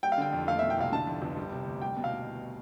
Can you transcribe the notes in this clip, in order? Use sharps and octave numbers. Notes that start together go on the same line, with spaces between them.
G3 G5
F5
D3 G5
F2
A3 F5
B2 E5
G5
C2 F5
D3 A5
F2
G1
G3
C3
D2
G3 G5
B2
F5